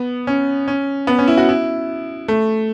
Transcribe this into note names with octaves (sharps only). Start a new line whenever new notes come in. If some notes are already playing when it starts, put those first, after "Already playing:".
Already playing: B3
C#4
C#4
B3
C#4
E4
F#4
E4
A3